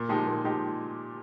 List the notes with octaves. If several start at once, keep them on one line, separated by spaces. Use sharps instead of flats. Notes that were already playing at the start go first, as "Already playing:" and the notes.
Already playing: A#2
F3 G#3 D#4 G4
A#2
F3 G#3 D#4 G4